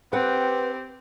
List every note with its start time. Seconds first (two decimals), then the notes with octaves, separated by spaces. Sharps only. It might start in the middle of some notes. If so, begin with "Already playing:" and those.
0.13 C4 G4 B4 F#5 G5